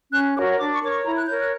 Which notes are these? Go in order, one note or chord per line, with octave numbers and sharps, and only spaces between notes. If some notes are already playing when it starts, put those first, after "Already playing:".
C#4 F#6
F#4 A#4 C#5 D6
D4 D6
C#6
A#4 C#5 D6
C#6
E4 A#5
F#6
A#4 C#5 G6
F#6